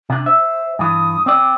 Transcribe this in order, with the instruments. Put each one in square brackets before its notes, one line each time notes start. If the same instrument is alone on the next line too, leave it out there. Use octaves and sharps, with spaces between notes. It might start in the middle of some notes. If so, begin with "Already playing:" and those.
[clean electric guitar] C3 D4
[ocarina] C5 [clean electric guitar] E5
[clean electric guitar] G2 E3 [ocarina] D#6
[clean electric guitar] C4 D5 [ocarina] G5